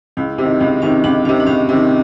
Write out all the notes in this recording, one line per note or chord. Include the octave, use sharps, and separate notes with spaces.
C#2 E4
C3 D#3
C#2 D4
C3 D#3 C#4
C#2 D4
C3 D#3 C#4
D4
C#2 C#4
C3 D#3